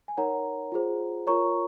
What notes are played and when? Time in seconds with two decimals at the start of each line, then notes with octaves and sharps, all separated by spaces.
0.08 G#5
0.17 D#4 A#4 C#5 F#5 A#5
0.72 F4 G#4 C5
1.27 F4 A#4 C#5 A#5 C#6